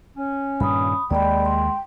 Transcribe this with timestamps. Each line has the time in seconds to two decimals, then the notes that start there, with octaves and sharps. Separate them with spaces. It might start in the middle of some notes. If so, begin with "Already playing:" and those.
0.16 C#4
0.60 G2 A#2 D#3 B5 D#6
1.11 D#2 G#3 A#3 D5 G5 B5
1.45 C6